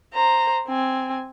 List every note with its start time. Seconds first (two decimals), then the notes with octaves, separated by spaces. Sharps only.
0.14 C5 A#5
0.68 C4 G#5